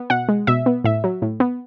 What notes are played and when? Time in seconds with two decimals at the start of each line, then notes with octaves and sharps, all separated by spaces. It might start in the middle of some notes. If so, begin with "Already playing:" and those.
Already playing: B3
0.10 B2 F#5
0.28 G#3
0.47 B2 E5
0.66 B3
0.84 A2 E5
1.04 F#3
1.22 A2
1.40 B3